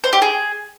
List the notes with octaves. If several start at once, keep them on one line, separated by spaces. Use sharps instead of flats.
C5
G4
G#4